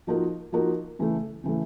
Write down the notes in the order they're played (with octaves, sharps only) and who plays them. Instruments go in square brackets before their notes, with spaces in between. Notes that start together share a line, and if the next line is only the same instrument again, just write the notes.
[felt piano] F3 A#3 D#4 F#4 A#4
F3 A#3 D#4 F#4 A#4
C#3 E3 A3
C#3 E3 A3